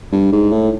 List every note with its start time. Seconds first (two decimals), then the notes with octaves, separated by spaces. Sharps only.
0.12 G2
0.33 G#2
0.52 A2